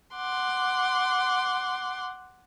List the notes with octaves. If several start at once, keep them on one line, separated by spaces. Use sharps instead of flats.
F#5 C6 D6